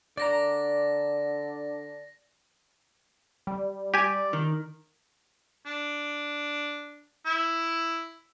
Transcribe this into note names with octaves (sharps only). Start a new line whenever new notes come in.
D3 D4 D5 A#5 A6 A#6
G3
G4 D5 G#5
D#3
D4
E4